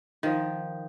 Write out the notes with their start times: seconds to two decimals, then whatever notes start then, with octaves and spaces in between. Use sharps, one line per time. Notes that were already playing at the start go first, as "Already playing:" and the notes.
0.23 D#3 F3